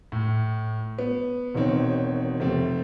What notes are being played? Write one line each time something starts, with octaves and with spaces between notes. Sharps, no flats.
A2
B3
E1 B2 D#3 C4 C#5
F1 A3 C4